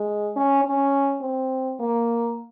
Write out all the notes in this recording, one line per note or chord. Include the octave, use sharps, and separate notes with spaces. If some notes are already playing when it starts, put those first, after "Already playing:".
Already playing: G#3
C#4
C#4
C4
A#3